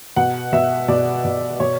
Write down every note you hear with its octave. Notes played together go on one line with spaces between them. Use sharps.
B2 F#5
B2 E5
B2 D5
B2
B2 C#5